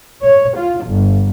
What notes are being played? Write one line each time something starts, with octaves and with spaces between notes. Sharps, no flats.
C#5
F4
G1